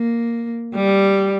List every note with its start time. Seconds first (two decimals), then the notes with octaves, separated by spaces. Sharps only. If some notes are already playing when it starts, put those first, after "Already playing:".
Already playing: A#3
0.74 G3